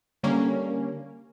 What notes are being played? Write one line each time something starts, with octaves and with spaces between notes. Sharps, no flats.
D3 G3 A#3 C#4